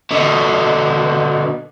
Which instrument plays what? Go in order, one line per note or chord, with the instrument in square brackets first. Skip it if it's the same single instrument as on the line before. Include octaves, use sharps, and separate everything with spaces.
[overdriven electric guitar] B2 D3